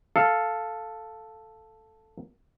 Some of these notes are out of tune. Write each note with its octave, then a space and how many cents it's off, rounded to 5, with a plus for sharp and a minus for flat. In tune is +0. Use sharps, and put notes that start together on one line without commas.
A4 +0 F5 +0